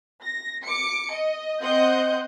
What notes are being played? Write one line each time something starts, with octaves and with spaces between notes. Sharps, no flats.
A#6
D6 C#7
D#5
C4 C5 D#5 F#5 G6